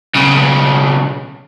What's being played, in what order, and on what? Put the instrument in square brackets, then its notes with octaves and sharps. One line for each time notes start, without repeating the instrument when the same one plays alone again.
[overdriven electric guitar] B1 C#3